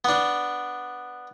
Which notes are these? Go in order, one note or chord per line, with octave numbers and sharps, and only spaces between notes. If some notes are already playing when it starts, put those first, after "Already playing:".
B3 D4